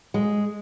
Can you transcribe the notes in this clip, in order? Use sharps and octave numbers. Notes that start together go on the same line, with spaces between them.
G#3